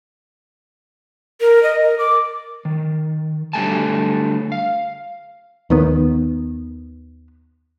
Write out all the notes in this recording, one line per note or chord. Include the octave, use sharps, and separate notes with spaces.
A#4
D#5
A#4
D6
D#3
D3 F#3 G3 A3 G#5 A5
F5
D#2 D#3 B3